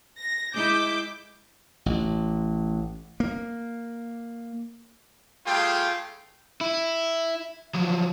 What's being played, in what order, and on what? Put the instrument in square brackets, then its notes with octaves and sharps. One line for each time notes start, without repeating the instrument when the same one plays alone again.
[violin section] A#6
[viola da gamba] G#3 E4 [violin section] D6 G6
[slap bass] A1
A#3
[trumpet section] G3 A3 F4 G#4 G5
[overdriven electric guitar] E4
F3 F#3